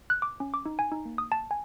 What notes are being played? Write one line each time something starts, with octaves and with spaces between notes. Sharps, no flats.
F#6
D6
C#4
D6
D#4
G#5
D#4
A#3
D#6
A5
G#5